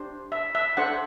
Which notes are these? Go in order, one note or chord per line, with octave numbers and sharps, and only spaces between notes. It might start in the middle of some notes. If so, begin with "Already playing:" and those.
Already playing: D4 G4 C5
E5
E5
D4 A4 C5 F#5